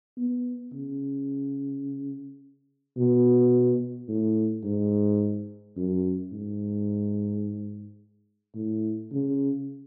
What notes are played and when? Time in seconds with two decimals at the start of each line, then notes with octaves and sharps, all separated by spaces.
0.17 B3
0.73 C#3
2.97 B2
4.08 A2
4.64 G#2
5.76 F#2
6.32 G#2
8.55 A2
9.12 C#3